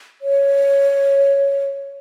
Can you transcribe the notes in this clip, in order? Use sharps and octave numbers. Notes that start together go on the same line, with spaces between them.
C#5